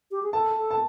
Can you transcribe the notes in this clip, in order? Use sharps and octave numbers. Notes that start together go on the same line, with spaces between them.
G4
G#4
A4 A5
A4
A5